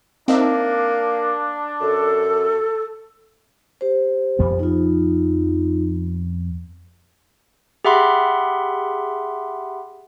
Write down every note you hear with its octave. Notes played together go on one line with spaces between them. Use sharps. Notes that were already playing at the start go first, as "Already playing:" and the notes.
A#3 C4 D4 D#4 E5
F#2 A4
G4 C5
F2 F3 B3
D#4 F4
G4 G#4 E5 F#5 B5 C6